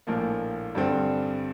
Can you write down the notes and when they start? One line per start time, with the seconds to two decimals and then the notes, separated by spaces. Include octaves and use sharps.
0.07 A#1 A2 F3 A#3
0.75 G2 D3 G3 C4